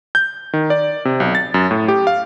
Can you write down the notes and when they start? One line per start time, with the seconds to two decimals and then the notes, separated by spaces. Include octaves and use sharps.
0.15 G6
0.53 D#3
0.70 D5
1.05 C3
1.20 B1
1.35 A6
1.54 F#2
1.71 A2
1.88 G4
2.07 F5